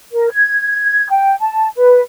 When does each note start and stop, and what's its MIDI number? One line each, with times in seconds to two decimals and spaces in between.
0.12 0.29 70
0.30 1.06 92
1.09 1.35 79
1.41 1.68 81
1.76 2.00 71